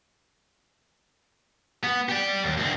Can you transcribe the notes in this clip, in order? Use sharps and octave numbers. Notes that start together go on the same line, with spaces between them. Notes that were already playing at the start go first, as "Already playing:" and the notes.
B3
G4 D5
D#2
D2 C4